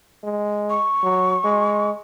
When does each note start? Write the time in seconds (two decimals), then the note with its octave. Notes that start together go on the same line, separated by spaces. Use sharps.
0.23 G#3
0.70 C#6
1.03 F#3
1.44 G#3